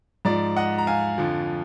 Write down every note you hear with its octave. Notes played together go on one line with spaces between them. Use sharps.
G#2 F3 D5
D#5 F#5
A#5
F5 G#5
F2 D3 F3